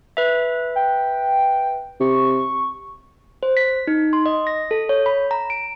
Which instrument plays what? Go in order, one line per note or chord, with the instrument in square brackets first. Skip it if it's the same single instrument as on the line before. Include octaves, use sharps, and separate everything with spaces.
[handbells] B4 E5
[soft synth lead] G5
[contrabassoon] C3 [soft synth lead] C#6
[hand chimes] C5
B6
D#4
C6
D#5
A#6
A4
C#5
B5
A#5
D7